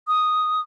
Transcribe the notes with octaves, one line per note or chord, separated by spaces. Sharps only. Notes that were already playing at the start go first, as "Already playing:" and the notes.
D#6